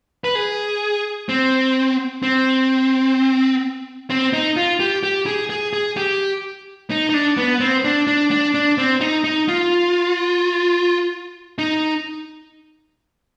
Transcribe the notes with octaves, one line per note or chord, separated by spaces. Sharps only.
B4
G#4
C4
C4
C4
D#4
F4
G4
G4
G#4
G#4
G#4
G4
D#4
D#4
D4
B3
C4
D4
D4
D4
D4
C4
D#4
D#4
F4
D#4